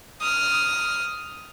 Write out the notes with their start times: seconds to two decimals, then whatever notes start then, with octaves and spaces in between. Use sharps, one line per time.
0.21 D#6 F6